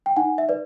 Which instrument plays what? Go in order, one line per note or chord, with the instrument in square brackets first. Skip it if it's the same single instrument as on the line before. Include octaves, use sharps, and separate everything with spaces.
[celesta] G5
D#4 F#5 G#5
E5
B4 D5